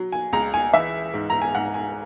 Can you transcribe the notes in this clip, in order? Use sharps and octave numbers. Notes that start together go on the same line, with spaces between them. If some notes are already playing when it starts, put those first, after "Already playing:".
Already playing: F#3
G#5
C#2 A#5
G#5
E3 E5
G#2
A#5
G#5
G#2 F#5
G#5